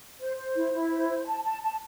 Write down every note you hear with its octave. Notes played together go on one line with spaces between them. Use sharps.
C5
C5
E4
E4
C5
C5
A5
A5
A5